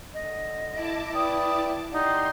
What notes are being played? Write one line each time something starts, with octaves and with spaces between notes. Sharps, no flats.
D3 D#5
E4 A5 D6
B4 D5 G5 D#6
D#4 G4 D5 F#5 C6